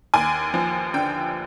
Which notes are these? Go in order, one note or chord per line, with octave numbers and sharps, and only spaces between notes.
D#2 G#5
F3
D3 G5